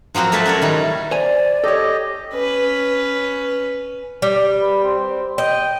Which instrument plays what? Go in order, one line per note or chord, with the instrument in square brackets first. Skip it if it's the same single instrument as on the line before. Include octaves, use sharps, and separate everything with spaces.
[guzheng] F3 F#3 A#3 C4 F#4
A3 A#3 A#4 B4 E5 A5
C#4 F#4 C#5 D5
D#3 G3 E4
[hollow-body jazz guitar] C5 G#5 [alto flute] D5
[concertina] G4 D#5 [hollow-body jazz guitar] A4 C#5
[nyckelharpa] C#4 B4
[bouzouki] G3
[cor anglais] B4
C4
[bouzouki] D#5 [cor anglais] G5